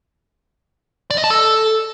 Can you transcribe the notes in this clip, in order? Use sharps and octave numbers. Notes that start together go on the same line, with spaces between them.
D5
D#5
A5
A4